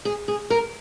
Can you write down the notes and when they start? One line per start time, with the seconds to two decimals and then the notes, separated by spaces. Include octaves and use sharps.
0.05 G#4
0.28 G#4
0.50 A#4